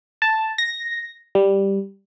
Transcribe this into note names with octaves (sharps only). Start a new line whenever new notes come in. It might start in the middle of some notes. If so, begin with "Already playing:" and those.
A5
A#6
G3